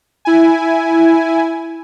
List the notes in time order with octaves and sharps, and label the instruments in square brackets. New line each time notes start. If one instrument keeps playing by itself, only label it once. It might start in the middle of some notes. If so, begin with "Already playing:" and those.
[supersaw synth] E4 G#5